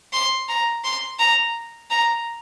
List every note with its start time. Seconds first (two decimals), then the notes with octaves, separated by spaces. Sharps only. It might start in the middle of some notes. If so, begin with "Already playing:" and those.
0.13 C6
0.49 A#5
0.84 C6
1.19 A#5
1.91 A#5